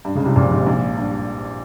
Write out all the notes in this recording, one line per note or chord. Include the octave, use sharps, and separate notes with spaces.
G2
C#2 C#3
C2 C3
A#1 A#2
G#1 G#2
A#1 A#2
G2